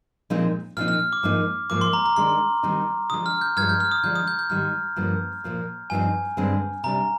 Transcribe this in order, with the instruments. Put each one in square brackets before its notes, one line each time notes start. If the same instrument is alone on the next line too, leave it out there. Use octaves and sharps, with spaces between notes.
[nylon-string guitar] A#2 F3 G#3 C4 D#4
[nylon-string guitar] A#2 F3 C4 D#4 [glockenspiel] F6
[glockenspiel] F6
D6
[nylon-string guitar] G#2 F3 A#3 D#4
[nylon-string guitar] G#2 F3 A#3 [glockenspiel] D6
[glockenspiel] C6
A#5
A#5
[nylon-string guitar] D#3 G#3 D4 [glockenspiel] C6
[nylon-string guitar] D#3 G3 C4 D#4
[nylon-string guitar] D3 F3 G#3 [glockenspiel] D#6
[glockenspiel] F6
G6
[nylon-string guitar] G2 F3 G#3 [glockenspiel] F6 G#6
[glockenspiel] G6
F6
D#6
[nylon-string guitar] D3 F3 G#3 D4 [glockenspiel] G6
[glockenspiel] D#6
G6
G6
[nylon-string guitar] G#2 D#3 G3 [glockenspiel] F6
[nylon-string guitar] G2 D3 F3 A#3
A#2 F3 A#3
[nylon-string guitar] G2 F3 C4 D#4 [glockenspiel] G#5
[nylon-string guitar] G2 D3 G#3 C4
[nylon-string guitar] C3 G3 D4 [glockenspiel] A#5